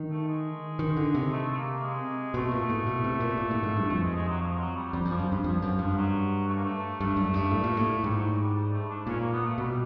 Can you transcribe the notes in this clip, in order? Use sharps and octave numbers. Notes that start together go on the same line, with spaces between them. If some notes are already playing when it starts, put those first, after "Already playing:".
Already playing: D#3
A3
G#3
D#3
D3
C3
A3
A3
A#3
G#3
B2 A3
A#2
A2
B2
C3
A#2
A#2
A2
G#2
G2
F2 A3
G#3
G#3
F#3
F3
F#3
G3
F2 G3
F2
F3
F#2
G2
F2 F3
F#2
G2
F#3
A3
A#3
A3
G2 A3
F#2
G2
A2
A#2
A2
G#2 G3
F#3
G3
G3
A3
D4
A#2 C#4
A#3
B3
A3
B2 G3